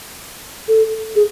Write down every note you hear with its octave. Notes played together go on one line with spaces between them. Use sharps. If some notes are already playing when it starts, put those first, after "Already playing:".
A4
G#4